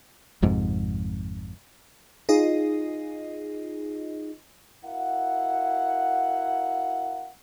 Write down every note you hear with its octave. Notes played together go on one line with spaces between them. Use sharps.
G#1 F2 G#2 C3
D#4 F4 G#4 D#5
E4 F#4 A#4 F5 F#5